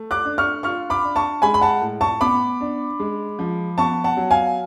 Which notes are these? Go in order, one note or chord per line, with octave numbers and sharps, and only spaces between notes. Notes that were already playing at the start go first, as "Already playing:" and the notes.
Already playing: A3
D6 F#6
D4
C#6 F6
F4 C#6 F6
B5 D6
D4
A5 C#6
G#3 G#5 B5
B5
F#5 A5
A2
A5 C#6
B3 B5 D6
D4
G#3
F3
B3 A5 C#6
F#5 A5
F#3
F5 G#5